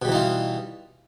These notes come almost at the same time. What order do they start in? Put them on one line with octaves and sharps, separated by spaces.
B2 G3 E3 D#4 F4